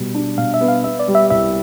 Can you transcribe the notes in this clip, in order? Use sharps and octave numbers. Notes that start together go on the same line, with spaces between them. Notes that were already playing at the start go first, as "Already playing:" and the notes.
Already playing: B2 G3
D4
B2 F5
E5
B3
F5
B3 E5
D5
G3
E5
C2 E5